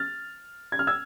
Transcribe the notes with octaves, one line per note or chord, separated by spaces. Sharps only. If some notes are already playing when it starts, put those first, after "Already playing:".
Already playing: F6 A6
G#6
F6
E6 G#6